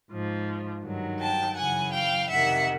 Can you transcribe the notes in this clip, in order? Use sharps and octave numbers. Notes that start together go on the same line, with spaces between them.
G#2 F3
G2 D#3 F#3
G5 A5
F#2 C#3 E3 F#5 G#5
F5 G5
F2 C3 D#3 E5 F#5